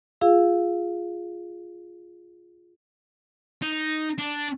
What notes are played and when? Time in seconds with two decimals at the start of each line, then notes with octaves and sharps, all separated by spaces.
0.21 F4 G#4 F5 E6
3.62 D#4
4.18 D4